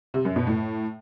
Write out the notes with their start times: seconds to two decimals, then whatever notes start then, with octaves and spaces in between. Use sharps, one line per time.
0.14 C3
0.25 F#2
0.36 B2
0.47 A2